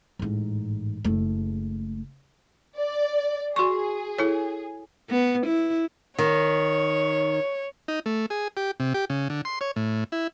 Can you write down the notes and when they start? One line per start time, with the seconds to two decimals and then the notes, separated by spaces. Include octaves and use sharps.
0.19 A1 G#2
1.04 F#1 A3
2.77 D5
3.56 F#4 G#4 C6 C#6
4.18 E4 A4 C#5
5.10 B3
5.47 E4
6.18 D#3 C#5
7.88 D#4
8.06 A3
8.30 G#4
8.57 G4
8.80 C3
8.94 G4
9.10 C#3
9.30 D3
9.45 C6
9.61 C#5
9.76 A2
10.12 E4